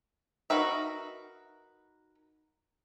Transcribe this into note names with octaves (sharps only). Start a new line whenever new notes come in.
D#4 F#4 A#4 B4 E5